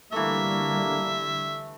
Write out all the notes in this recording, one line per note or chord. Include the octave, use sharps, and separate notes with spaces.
D3 E3 G3 A3 A#3 E5